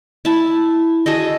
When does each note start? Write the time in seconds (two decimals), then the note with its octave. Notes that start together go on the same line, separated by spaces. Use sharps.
0.25 E4 A5
1.06 F#4 G#4 A4 D#5